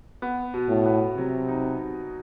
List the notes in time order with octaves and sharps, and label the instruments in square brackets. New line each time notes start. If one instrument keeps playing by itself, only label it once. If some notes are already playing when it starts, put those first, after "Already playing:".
[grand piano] B3
B2
[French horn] A2
[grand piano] B3
[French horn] C3 [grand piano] F#3
[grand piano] D#4